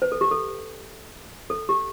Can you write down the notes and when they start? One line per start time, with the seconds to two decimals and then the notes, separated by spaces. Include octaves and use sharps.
0.02 B4
0.12 A4
0.21 G4
0.31 A4
1.50 A4
1.69 G4